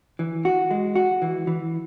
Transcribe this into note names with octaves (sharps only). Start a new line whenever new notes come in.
E3
F#4
G#3
F#4
E3
E3